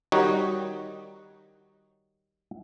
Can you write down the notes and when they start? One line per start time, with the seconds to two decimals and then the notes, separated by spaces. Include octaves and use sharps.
0.12 D#3 G3 D#4 F#4 C#5